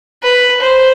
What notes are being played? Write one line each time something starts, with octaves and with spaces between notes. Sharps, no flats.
B4
C5